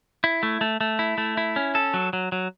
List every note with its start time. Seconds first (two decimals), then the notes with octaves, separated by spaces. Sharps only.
0.24 E4
0.43 A3
0.61 A3
0.81 A3
0.99 E4
1.18 A3
1.37 E4
1.56 C#4
1.75 A4
1.94 F#3
2.13 F#3
2.32 F#3